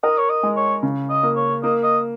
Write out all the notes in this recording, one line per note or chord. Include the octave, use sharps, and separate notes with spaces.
A#4 D#5
C#5
D#5
G#3
C#5
C#3
D#5
A#3
C#5
A#3 D#5
D#5